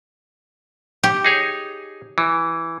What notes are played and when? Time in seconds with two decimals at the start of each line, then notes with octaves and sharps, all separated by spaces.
1.03 G4
1.24 D#4 G#4 C#5
2.18 E3